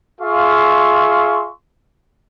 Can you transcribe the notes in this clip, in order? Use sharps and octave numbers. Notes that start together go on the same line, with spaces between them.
F4 G#4 E5 F5 C6 C#6